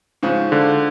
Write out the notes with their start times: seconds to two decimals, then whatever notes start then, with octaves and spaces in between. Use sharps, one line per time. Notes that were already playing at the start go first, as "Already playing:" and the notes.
0.23 G#2 C#3 F3
0.52 D3